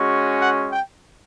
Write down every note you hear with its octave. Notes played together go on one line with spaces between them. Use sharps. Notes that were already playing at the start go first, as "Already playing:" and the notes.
Already playing: G#3 C#4 F#4
F#5
G5